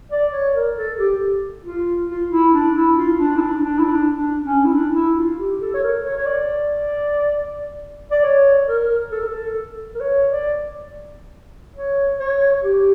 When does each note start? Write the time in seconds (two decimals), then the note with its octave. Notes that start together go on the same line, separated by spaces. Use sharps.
0.12 D5
0.33 C#5
0.54 A#4
0.77 A4
0.99 G4
1.65 F4
2.09 F4
2.32 E4
2.53 D4
2.75 E4
2.96 F4
3.19 D4
3.37 E4
3.41 D4
3.62 D4
3.79 E4
3.84 D4
4.14 D4
4.44 C#4
4.65 E4
4.73 D4
4.94 E4
5.17 F4
5.39 G4
5.61 A4
5.74 C#5
5.83 A#4
6.05 C#5
6.17 C#5
6.26 D5
8.11 D5
8.24 C#5
8.68 A#4
9.12 A4
9.20 A#4
9.27 A4
9.95 A#4
10.01 C#5
10.30 D5
11.76 C#5
12.20 C#5
12.64 G4